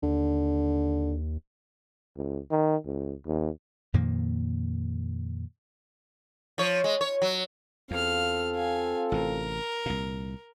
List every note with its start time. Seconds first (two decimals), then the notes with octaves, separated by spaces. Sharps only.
0.03 D#2 D3
2.17 C#2
2.51 D#3
2.86 C#2
3.26 D#2
3.94 F2 A#2 D#3 A#3
6.58 F3 C#5
6.84 G#3
7.01 C#5
7.22 F#3
7.91 E2 C4 F4 A4 F5 F6
8.56 F5 G#5
9.12 A1 C3 A#4
9.86 C2 A#2